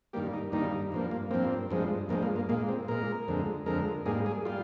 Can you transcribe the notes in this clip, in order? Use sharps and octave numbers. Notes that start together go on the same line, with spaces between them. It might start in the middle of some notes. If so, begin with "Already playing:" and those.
G2 D#3 G3 A#3 G4
D#4
G2 D#3 G3 A#3 D#4
G2 F3 A#3
A#3
G2 F3 A#3 C4
G2 F3 G#3
G2 F3 G#3 A#3
A#3
A#3
A#2 G#3 A#3
C4
A#2 G#3 A#4
F2 D3 G#3
F2 D3 G#3 A#4
G#2 G3 A#3 G#4
G#4
G3 F4